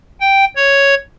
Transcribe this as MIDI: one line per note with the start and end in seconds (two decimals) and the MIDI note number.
0.20 0.45 79
0.56 0.95 73